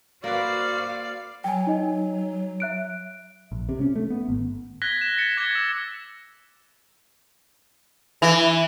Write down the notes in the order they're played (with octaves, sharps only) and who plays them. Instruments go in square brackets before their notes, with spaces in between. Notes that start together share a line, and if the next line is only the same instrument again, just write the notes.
[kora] A#3 B4 [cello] F#4 C5 [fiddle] D5 [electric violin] F5
[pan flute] F#3 [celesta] G5 G#5
[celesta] D#4 D#5 G#5
E5 F#6 D7
[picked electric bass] A#1
C3
C#4
A3
B3
G#1
[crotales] F#6 G#6 A#6 B6 G7
E7
A6 B6 C#7
D6 G#6 B6 E7 G7
E6 F#6
[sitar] E3